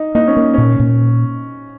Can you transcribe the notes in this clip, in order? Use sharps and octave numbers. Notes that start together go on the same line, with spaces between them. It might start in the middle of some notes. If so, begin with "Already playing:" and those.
Already playing: D#4
A#3 D#4
C#4
A#3
A#2 C#4
A#2